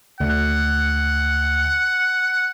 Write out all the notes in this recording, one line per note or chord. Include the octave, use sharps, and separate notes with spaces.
D2 F#5